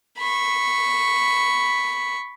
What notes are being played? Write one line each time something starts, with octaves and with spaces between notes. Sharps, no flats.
B5 C#6